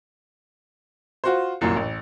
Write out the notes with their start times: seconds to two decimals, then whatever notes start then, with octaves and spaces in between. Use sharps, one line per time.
1.24 F4 F#4 C5
1.61 C2 F#2 A#2 E3
1.76 A1